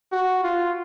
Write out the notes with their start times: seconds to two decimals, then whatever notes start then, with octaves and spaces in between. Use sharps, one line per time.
0.12 F#4
0.44 F4